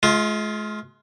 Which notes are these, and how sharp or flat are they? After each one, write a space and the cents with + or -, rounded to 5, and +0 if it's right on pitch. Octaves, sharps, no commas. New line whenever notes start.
G#3 +40 F4 +0